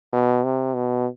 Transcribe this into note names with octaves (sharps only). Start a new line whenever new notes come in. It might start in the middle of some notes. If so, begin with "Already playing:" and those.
B2
C3
B2